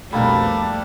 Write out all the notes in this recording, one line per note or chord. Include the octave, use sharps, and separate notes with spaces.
C2 F2 B2 G3 A3 A#3 D4